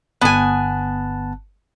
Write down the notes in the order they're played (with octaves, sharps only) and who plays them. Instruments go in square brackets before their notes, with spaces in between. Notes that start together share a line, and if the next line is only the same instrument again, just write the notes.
[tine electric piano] G1 A5 F#6 [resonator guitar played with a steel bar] B3 G#5